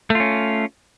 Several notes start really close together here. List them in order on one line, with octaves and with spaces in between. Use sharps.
A3 F4 C#4